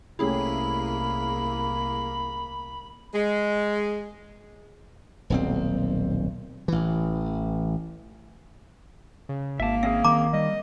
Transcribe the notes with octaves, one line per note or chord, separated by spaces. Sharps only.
C2 A3 A#3 C#4 E4 G4 G#4 B5
G#3
D#1 B1 C4
A1 E3
C#3
G#1 A#3 E5 A5
C4 C#4 G#4 E5
D#3 A#5 D6
G3 D#5